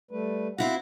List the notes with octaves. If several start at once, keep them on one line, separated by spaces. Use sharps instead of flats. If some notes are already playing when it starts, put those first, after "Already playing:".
G3 A3 B4
C4 E4 F#4 F5 F#5